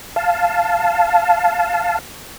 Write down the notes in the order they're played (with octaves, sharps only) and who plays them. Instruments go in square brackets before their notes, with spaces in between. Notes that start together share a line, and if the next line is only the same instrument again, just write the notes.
[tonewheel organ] F5 A5